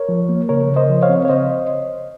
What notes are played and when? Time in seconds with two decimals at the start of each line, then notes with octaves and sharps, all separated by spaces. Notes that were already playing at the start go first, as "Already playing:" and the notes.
Already playing: A#4 C#5
0.09 F3
0.29 A#3
0.49 C#3 A#4 C#5
0.70 C#3
0.76 C5 D#5
0.90 F3
1.02 C#5 F5
1.09 C4
1.25 C#5
1.29 C#3 C5 D#5